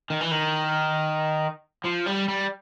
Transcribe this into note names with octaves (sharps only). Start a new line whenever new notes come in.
D#3
E3
D#3
F3
G3
G3